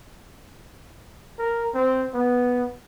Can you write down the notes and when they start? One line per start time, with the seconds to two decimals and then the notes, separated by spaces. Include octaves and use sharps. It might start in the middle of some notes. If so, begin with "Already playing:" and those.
1.39 A#4
1.74 C4
2.14 B3